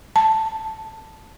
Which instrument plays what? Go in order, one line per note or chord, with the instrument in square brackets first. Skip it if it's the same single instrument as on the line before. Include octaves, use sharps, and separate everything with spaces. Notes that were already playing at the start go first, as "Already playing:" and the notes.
[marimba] A5